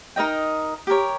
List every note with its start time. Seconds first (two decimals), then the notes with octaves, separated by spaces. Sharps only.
0.16 D#4 A#4 D#5 G5
0.87 G4 A#4 C#5